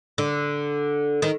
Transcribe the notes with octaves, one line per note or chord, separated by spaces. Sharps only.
D3
D#3